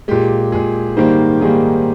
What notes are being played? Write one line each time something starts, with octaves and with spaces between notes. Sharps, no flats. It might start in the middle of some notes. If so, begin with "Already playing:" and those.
A#2 G#3 G4
A#2 G#3 G#4
G#2 D#3 G3 A#3 C5
G#2 D#3 G3 A#3 G#4